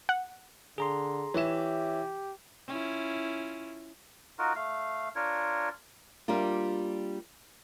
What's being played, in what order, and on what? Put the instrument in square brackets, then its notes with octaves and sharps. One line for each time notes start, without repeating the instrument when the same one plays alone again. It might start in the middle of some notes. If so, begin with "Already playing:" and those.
[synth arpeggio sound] F#5
[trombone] D3 [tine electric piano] G#4 A#5 C6
[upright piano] E3 E7 [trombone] G4 [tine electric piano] C#5 E5
[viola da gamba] C#4 E4 F4
[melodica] D#4 F4 F#4 A#4
A3 F5
D4 F4 A#4 C#5
[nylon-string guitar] G3 A#3 D4 F4